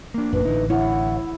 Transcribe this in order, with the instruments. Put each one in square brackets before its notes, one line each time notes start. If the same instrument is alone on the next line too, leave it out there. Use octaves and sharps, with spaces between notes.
[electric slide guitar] A#3 D4
[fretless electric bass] G#1 F#2 A#2 [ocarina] B4
[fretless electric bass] A1 D3 [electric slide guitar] D#4 E4
[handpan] E4 [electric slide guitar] C#5 [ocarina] F#5